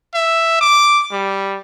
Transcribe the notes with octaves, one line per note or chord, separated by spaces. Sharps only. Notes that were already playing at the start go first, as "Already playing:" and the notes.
E5
D6
G3